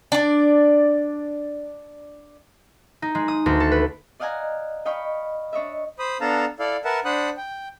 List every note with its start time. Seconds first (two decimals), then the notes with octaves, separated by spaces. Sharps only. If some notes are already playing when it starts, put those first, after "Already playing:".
0.12 D4 D5
3.02 D#4
3.15 G#3
3.28 D#6
3.46 D2
3.60 A4
3.72 B4
4.20 D5 D#5 F5 F#5 G#5 A#5
4.85 D#5 F5 G5 B5 C#6
5.53 D4 C#5 D#5 E5
5.99 C5 B5 D#6
6.21 B3 D4 A4 F5 A5 A#5
6.59 E4 A4 D5 F5
6.85 A#4 B4 E5 F#5 A5
7.05 D4 C5 F#5 B5 D#6 F#6
7.37 G5